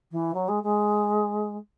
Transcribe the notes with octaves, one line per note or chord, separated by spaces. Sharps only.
E3
F#3
G#3
G#3